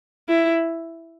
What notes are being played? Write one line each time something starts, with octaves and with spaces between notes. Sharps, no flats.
E4